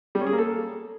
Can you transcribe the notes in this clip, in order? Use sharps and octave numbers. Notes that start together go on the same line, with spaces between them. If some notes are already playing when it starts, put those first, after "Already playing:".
G3
C#4
G#4
A#3
A4